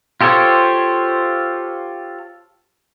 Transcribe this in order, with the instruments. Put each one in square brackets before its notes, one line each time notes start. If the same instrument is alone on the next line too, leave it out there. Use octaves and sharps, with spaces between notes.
[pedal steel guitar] F4 G4 A4 C5 C#5